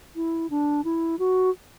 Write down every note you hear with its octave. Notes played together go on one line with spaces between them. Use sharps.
E4
D4
E4
F#4